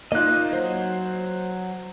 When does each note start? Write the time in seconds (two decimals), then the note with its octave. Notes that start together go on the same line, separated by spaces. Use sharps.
0.12 A#3 D#4 F4 D#5 F#6
0.53 F#3 C5